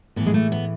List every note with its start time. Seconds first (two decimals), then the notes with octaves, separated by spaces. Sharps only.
0.16 A2 E3 B3
0.26 G#3
0.34 A3
0.52 B3